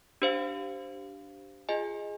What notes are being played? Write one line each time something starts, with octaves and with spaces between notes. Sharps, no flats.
D4 G4 C5 F5
F4 G#4 D#5 G#5